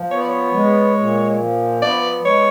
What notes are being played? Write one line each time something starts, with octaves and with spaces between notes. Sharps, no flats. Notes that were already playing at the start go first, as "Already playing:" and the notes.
Already playing: F3
B3 C#5
D5
C#5
G#3
A#2
F3
B3 D5
G#3 C#5